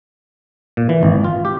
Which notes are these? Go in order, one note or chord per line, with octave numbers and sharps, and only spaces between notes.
A#2
E3
G#1
F4
G4